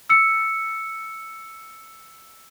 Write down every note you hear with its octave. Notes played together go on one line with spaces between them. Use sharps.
E6 C#7